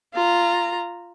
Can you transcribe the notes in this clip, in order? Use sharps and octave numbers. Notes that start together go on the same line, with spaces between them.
F4 A#5